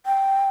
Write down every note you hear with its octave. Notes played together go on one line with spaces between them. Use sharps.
G5